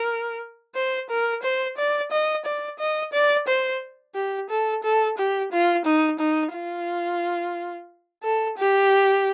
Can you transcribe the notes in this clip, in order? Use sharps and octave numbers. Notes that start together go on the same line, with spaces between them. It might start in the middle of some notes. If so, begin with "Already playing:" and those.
Already playing: A#4
C5
A#4
C5
D5
D#5
D5
D#5
D5
C5
G4
A4
A4
G4
F4
D#4
D#4
F4
A4
G4